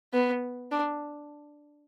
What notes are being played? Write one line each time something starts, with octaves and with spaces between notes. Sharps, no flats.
B3
D4